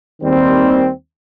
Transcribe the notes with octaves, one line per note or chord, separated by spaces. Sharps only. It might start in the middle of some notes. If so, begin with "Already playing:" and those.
D#2 D#3 G3 C4